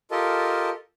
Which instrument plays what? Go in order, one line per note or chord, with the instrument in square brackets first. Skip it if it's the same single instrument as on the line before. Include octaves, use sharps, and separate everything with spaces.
[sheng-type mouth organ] F4 G4 A4 A#4 D#5 A5